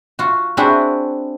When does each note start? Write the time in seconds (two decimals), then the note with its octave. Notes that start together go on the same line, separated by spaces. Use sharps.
0.19 F4 F#4
0.57 C4 D4 E4 F#4 G#4